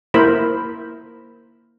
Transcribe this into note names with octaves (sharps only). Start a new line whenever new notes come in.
A#3 E4 A#4 C5 B5